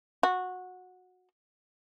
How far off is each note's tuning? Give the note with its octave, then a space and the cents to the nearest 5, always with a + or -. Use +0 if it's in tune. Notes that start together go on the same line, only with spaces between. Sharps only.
F#4 -15